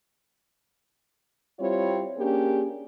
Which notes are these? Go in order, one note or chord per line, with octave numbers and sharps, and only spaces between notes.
G3 C4 E4 F4 C#5
A#3 C#4 D4 G4 G#4